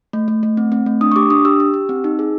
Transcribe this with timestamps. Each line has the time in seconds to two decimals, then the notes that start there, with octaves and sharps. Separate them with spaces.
0.13 A3
0.28 A3
0.43 A3
0.57 C4
0.72 C4
0.86 A3
1.01 D4 D#6
1.12 C#6
1.16 G4 D6
1.30 D4 D#6
1.45 G4 E6
1.60 G4
1.74 G4
1.89 C4
2.04 D#4
2.19 G#4